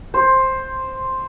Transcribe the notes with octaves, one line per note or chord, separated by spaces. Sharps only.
C5